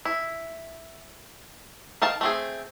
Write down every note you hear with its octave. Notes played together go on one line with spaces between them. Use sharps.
E4
D#3 A#4 F5 A5
A3 C4 G#4